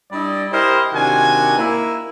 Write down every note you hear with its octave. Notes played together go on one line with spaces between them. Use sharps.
G3 D4 E4 D5 D#5
E4 G4 A#4 C5 D#5
C3 D#3 D4 F#4 G#5
A#3 E4